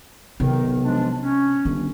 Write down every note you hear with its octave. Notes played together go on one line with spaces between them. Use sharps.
B1 C3 D#3
F3 G#3 D4
C#4
G1 D#3